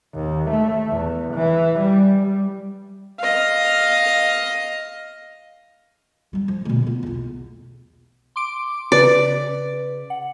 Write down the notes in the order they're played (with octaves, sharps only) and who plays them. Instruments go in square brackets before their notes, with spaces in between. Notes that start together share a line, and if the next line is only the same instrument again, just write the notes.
[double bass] D#2
A3
E2
E3
G3
[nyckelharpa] D#5 F5
[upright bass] F#3 G3
F3
D2 B2
B3 F4
B1 E2
[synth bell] C6 D6 D7
[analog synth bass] C#3 [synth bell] B4 [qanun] D5
[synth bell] F#5